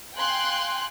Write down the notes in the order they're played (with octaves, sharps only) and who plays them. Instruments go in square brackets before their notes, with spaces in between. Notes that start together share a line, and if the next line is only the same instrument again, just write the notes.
[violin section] F5 G5 G#5 C6 F#6